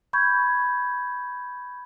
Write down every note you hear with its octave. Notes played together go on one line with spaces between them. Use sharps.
B5 C#6 G6 G#6